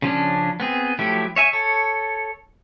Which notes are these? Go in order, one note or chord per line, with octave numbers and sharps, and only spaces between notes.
C#3 F3 C#4 D4
B3 C4 G#4
F3 F#3 A3 E4 G4
C#5 E5 G#5
A4 C#5